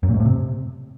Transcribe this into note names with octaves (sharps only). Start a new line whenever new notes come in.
F#2
A#2
G#2
A2
C3